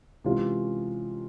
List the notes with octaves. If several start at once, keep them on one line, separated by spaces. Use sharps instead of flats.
C3 E3 G#3 C#4 F4